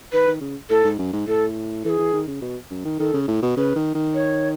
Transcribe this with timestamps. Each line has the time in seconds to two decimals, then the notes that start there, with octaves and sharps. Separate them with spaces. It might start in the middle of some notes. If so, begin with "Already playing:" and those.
0.13 D#3 B4
0.27 D#3
0.41 C#3
0.70 A2 A4
0.84 G#2
0.99 F#2
1.13 G#2
1.27 A2 A4
1.84 E3 G#4 A4
1.99 E3
2.13 D#3
2.27 C#3
2.42 B2
2.71 F#2
2.85 D#3
2.99 D#3 A4
3.14 C#3
3.28 A2
3.42 B2
3.57 C#3 B4
3.76 D#3
3.95 D#3
4.14 C#5